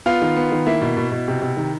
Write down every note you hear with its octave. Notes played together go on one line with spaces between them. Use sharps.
B3 F4 F5
D#3
B3
D#3
A#3 E4 E5
B2
B2
B2
C3
C3
D#3